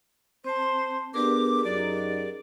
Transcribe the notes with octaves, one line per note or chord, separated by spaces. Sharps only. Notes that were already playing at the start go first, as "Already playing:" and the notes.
C4 C5 A5
B3 D4 G4 G#4 A#4 D6
F#2 F#3 D#4 D5